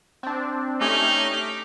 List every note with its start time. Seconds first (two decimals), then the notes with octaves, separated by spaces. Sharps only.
0.23 C4 D4
0.81 A3 C#4 D#4 G4
1.31 D6 B6